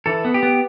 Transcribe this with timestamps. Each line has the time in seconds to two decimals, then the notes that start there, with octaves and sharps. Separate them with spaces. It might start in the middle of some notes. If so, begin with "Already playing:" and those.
0.06 E3 A4
0.25 B3
0.34 G4
0.43 B3